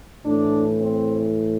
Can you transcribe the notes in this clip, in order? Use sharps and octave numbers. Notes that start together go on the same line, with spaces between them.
A2 E3 D4
C4